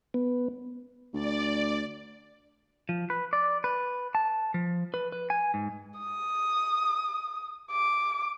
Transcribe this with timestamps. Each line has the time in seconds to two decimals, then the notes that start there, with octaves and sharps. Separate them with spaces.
0.14 B3
1.14 D2 D5
2.89 F3
3.10 B4
3.33 D5
3.64 B4
4.15 A5
4.54 F3
4.94 B4
5.12 B4
5.30 G#5
5.54 G#2
5.99 D#6
7.71 D6